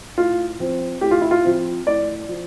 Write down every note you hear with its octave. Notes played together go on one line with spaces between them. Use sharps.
A2 F4
F3 C4
A2 G4
F4
E4
F4
F3 C4
A2 D5
F3